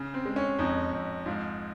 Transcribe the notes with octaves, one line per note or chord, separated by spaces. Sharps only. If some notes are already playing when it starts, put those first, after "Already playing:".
Already playing: C#3
C4
G#3
C#4
F2 D#4
F2
G#2 F4